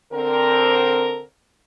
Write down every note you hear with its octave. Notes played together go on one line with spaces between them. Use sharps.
D3 C4 A#4